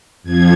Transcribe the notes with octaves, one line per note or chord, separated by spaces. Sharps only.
F2 F3 G#6